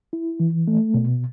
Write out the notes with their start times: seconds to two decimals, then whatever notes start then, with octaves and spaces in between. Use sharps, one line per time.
0.13 E4
0.40 E3
0.67 A3
0.94 B2